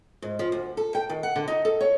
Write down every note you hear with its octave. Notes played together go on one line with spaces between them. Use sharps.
G#2
F3
D2
A4
G5
D#3
F#5
D3
D#4
A4
C#5